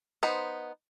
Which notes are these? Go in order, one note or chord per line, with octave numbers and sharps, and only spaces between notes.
B3 D#4 C5